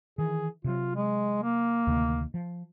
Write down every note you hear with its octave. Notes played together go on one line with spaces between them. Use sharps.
D#3 E3 G#4
C3 F#3 F4
G#3
A#3
D2 C3 D#3
F3